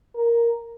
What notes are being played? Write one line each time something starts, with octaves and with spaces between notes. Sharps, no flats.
A#4